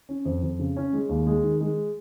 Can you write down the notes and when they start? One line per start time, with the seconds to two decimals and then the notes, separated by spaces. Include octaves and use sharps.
0.09 C#4
0.25 F2
0.43 F2
0.59 C#3
0.77 C#4
0.93 G#3
1.09 D#2
1.26 G#3
1.44 D#3
1.61 G#3